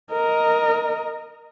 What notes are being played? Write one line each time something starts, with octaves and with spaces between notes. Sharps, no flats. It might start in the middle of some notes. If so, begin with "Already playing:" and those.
A#4 D#5